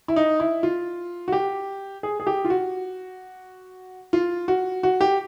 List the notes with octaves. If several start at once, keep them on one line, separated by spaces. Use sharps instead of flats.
E4
D#4
E4
F4
F#4
G4
G#4
G#4
G4
F4
F#4
F4
F#4
F#4
G4